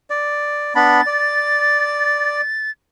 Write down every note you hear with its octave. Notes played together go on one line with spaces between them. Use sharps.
D5
B3 D4 B5 A6
D5